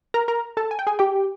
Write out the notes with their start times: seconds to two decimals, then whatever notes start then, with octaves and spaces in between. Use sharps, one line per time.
0.14 A#4 A#5
0.28 A#4 A#5
0.57 A4 A5
0.71 G#5
0.79 G5
0.87 G#4 G#5
0.99 G4 G5